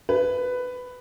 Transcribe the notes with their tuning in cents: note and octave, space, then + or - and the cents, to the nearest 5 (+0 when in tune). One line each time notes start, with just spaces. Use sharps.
B4 +10